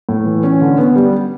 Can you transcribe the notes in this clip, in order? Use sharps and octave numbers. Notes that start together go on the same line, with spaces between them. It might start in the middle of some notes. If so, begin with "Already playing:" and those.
A2
E3
C#4
D3
B3
G3